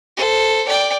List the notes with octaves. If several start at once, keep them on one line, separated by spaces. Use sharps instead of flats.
A4 C5
D5 G5